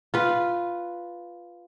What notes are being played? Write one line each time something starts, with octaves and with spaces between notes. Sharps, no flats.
F4 B4